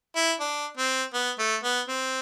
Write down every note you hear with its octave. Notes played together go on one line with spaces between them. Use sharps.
E4
D4
C4
B3
A3
B3
C4